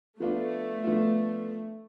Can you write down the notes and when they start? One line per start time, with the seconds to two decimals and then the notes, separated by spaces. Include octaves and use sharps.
0.20 F3 A3 B3 D4 F4
0.84 F3 B3 D4 F4